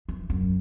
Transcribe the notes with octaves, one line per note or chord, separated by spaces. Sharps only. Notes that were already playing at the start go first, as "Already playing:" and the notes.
E3
F#2